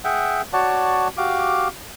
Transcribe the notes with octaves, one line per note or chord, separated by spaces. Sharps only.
G#4 E5 F#5 G5
F#4 C#5 D5 F#5 A5
F#4 G4 F5 D6